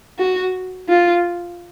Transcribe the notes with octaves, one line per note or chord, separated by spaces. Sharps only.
F#4
F4